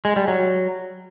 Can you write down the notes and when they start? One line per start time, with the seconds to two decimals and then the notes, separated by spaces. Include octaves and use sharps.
0.05 G#3
0.16 G3
0.28 F#3